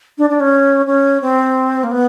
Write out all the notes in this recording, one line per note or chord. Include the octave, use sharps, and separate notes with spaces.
D4
D4
C#4
C#4
C4
A#3
B3